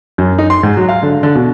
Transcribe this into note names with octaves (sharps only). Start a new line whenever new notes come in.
F#2
D#4
C6
G#2
F#3
F5
D3
D3
B2